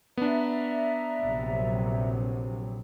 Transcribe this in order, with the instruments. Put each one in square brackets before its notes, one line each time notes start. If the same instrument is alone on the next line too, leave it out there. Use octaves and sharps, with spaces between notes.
[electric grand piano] B3 D4 [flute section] D5 E5 A#5
[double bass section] A#1 C3 F#3